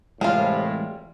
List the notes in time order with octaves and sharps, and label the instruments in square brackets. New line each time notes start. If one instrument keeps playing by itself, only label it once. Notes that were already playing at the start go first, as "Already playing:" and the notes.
[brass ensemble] C2 A2 [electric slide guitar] E3 G#3 [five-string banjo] G3 C#4 F4